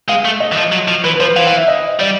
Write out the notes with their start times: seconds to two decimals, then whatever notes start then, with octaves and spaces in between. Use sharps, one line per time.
0.08 G#3 F5
0.25 A3
0.40 D#5
0.52 E3
0.57 F3
0.72 F#3
0.88 F3
1.04 E3 B4
1.14 B4
1.20 F3 C5
1.36 E3 F5
1.47 F5
1.57 E5
1.68 D#5
2.00 G3 D5